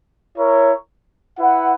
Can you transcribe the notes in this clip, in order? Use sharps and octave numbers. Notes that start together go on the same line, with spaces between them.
E4 A#4 C#5
E4 B4 F#5